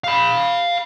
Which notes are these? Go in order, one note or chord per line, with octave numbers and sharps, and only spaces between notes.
F5 B5